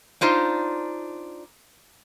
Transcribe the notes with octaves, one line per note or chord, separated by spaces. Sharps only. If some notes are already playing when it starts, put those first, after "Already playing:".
D4 D#4 F4 C5